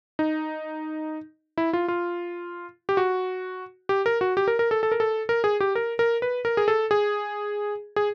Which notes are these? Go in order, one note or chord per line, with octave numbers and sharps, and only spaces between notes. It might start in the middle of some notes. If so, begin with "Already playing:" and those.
D#4
E4
F4
F4
G4
F#4
G4
A#4
F#4
G4
A#4
A#4
A4
A4
A#4
A4
A#4
G#4
G4
A#4
A#4
B4
A#4
G#4
A4
G#4
G#4